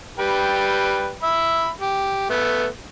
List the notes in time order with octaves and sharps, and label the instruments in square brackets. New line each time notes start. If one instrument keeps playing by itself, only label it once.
[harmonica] G3 B4 G5
E5 B5
G4
A3 B3